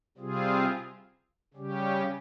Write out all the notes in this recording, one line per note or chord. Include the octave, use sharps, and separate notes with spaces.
C3 G3 C4 F4 G#4
C#3 G3 C#4 G4